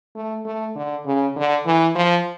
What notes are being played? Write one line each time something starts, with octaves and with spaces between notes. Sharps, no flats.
A3
A3
D3
C#3
D3
E3
F3